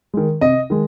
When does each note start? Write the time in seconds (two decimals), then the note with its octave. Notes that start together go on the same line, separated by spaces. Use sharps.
0.14 D#3 G#3
0.41 C3 D#5
0.70 D#3 G#3